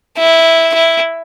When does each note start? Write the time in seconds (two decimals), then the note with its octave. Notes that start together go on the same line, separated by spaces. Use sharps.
0.18 E4
0.75 E4